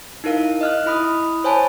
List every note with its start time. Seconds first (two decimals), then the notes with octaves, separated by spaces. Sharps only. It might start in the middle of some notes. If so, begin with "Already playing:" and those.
0.24 D#4 E4 A#4 F5
0.61 D#5 F6 F#6
0.86 E4 B5 D#6
1.44 C5 C#5 G#5 A5 B5